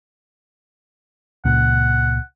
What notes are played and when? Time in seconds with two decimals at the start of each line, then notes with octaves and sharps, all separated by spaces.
1.45 C#2 A#2 F#5